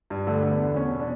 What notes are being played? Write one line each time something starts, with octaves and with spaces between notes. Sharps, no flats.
G2
D3 A3
D3
B3
E2
E2 C#4
B2
D4